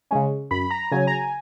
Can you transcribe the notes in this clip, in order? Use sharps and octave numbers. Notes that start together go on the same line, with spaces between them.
C#3 G#3 C#4
F#2 B5
A#5
C#3 F#3 G#5
A#5
G#5